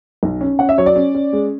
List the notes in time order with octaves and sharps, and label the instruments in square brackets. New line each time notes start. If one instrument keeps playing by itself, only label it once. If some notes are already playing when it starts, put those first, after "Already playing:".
[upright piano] B1
C#4
C#4 F#5
E5
F#3 C#5
D5
C#4
C#4
G#3